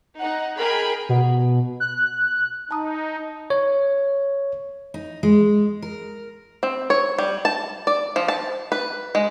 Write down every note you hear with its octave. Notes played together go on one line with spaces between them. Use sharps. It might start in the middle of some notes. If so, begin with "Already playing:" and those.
D#4 F#5
G#4 A#4 G5 B5
B2
F#6
D#4 A5 A#5 D#6
C#5
D#4
G#3
A#4
C4
C#5
G3
A5
D5
F3
A5
B4
G#3